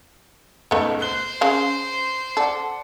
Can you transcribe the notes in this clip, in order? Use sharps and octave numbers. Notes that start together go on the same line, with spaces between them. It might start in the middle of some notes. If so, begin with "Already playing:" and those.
C#2 A#2 A3 B3 D#4
C5 F#6 G7
C#3 F5
A4 D5 F#5